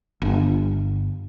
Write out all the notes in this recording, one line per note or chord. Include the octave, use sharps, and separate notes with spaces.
G1